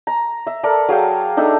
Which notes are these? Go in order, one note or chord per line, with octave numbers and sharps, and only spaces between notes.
A#5
E5
A4 A#4 D5
F#3 G#4 F5 G5
D4 D#4 A4 E5